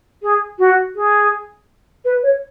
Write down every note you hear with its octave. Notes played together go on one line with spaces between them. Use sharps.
G#4
F#4
G#4
B4
C#5